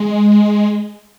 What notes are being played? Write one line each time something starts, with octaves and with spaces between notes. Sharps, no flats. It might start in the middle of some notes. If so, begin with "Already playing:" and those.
Already playing: G#3